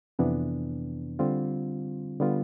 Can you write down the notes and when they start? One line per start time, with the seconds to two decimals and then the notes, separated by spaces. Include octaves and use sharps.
0.19 F2 C3 E3 B3 D4
1.19 D3 G3 C4 F4
2.20 D3 G3 B3 F4